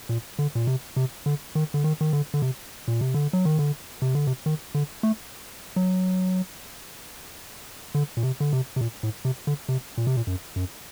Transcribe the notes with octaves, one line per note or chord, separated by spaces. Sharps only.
A#2
D3
A#2
C3
C3
D3
D#3
D3
D#3
D#3
D3
D3
C3
A#2
C3
D3
F#3
D#3
D3
C3
D3
C3
D#3
D3
A3
F#3
D3
A#2
C3
D3
C3
C3
A#2
A2
C3
D3
C3
A#2
C3
A#2
F#2
F#2